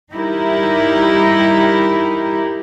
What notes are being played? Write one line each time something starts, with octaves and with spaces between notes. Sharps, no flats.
G3 D#4 E4 G4 A#4